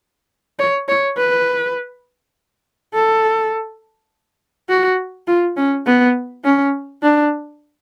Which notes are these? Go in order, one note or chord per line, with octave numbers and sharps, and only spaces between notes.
C#5
C#5
B4
A4
F#4
F4
C#4
B3
C#4
D4